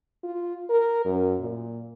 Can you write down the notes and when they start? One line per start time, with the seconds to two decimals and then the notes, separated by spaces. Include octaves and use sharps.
0.23 F4
0.70 A#4
1.05 F#2
1.40 A#2